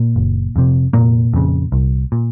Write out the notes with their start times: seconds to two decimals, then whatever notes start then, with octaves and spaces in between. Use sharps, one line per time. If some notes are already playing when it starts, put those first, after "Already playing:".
Already playing: A#2 A#3
0.16 F#1
0.56 F2 C3
0.93 F1 A#2 A#3
1.33 F2 C#3
1.72 C2
2.12 A#2